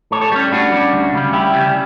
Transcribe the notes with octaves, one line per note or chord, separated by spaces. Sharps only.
A2 A4 C#5
A4 C#5
G3 C#4
A2 D4 F#4
G3 C#4
D2
C#3 G3 C#4
D2 E4 G4
C#3 G3 C#4